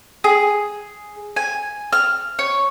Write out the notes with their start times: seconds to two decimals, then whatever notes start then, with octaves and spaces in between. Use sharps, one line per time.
0.24 G#4
1.36 G#5
1.93 F6
2.39 C#5